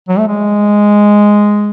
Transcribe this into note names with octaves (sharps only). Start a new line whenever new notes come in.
F#3
A3
G#3